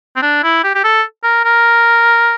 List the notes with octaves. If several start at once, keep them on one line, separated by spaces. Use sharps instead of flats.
C4
D4
E4
G4
G4
A4
A#4
A#4